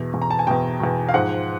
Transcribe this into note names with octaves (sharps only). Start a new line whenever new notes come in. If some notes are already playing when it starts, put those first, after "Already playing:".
Already playing: E2 B2
E2 B2
A#5
A5
G#5
E2 B2 G5
E2 B2
F5
G#2 F3 F#5